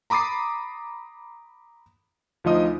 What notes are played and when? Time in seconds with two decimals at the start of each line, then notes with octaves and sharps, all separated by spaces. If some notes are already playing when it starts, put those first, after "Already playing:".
0.10 A#5 B5 D6 D#6 A6 C7
2.44 D2 F3 D#4 F4 D#5 D#6